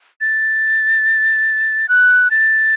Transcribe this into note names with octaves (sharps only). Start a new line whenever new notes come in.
A6
F#6
A6